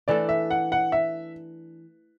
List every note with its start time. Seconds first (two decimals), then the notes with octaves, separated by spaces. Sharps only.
0.08 E3 A3 D4 A4 D5
0.29 E5
0.51 F#5
0.72 F#5
0.92 E5